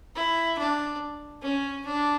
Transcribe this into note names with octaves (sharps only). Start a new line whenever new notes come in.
E4
D4
C#4
D4